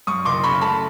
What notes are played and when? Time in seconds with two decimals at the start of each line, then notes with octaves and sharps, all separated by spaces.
0.07 F#2 C#6 D#6
0.25 F#1 C6 D6
0.43 C#3 B5 C#6
0.61 A3 A5 B5